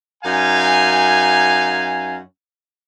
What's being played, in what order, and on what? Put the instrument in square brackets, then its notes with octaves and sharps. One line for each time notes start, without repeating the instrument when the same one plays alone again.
[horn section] F#2 D#4 F5 G#5